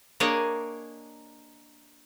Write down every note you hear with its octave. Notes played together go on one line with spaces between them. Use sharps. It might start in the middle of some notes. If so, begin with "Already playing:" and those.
A#3 D4 G#4 C#5 D#5